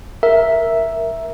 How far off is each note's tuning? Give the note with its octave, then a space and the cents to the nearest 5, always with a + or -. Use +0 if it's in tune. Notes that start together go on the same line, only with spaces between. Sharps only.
A#4 +5 E5 +0